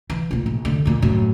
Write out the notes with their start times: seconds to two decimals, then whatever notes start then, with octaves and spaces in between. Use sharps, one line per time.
0.10 E3
0.31 A1 A#2
0.46 A#1
0.65 D3
0.85 F2 A#2
1.02 F#2 A2